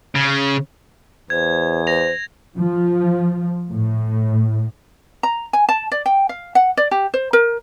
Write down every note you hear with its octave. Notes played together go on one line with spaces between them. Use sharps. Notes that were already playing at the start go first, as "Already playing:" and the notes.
C#3
E2 C5 G#6
C5 A#6 F7
F3
A2
A#5
G#5
A5
D5
G5
F5
F#5
D5
G4
C5
A#4